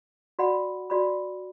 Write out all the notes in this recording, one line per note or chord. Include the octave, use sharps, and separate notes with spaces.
F#4 D5 F#5 B5
F#4 D5 B5